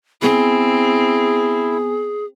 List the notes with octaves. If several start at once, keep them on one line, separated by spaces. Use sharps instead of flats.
B3 C4 E4 G#4 G#5